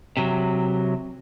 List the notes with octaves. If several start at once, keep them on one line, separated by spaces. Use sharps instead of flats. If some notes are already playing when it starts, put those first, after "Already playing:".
C3 F#3